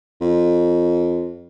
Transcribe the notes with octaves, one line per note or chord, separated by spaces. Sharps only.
F2